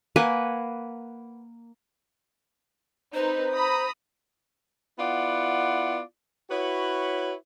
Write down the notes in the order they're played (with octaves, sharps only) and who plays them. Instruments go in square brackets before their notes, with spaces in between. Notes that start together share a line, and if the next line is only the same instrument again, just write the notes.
[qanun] A#3 B4 F#5 G#5
[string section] C4 D#4 B4 [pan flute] C5
[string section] A#5 B5 D#6
[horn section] B3 E4 F4 D5 F#5
E4 F#4 B4 C#5